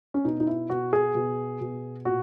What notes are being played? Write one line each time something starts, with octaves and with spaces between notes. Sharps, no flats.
C#4
B2 D#4
D#4
E4
B2 F#4
G#4
B2
B2
A#2 F#4